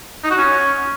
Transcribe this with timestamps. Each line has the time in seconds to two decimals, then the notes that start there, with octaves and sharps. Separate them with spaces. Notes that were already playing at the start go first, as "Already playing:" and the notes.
0.24 D#4
0.31 F#4
0.38 C#4